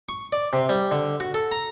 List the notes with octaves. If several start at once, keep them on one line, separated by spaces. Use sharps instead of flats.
C#6
D5
C3
G3
D3
F#4
A4
A#5